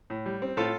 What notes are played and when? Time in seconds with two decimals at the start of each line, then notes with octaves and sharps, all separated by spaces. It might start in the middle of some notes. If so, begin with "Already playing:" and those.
0.10 A2
0.26 G3
0.42 C4
0.57 A2 F4 A4